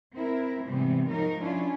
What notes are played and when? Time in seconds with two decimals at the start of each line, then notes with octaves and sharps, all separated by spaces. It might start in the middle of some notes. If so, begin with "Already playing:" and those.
0.13 C4 E4 A#4
0.66 G#2 C3 E3 G3 B3 C4
1.08 F3 F#3 G#3 D#4 A#4
1.41 C#4 D4 E4 F4